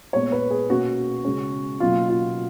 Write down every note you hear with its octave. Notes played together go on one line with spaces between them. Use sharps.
A#2 G#3 B3 C#5
B4
G#4
B2 A#3 C#4 F#4
C#3 G#3 C#4
B2 F#3 A#3 C#4 F4
F4